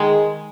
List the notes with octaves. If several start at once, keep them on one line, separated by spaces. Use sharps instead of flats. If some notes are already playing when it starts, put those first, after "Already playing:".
Already playing: D#3 G#3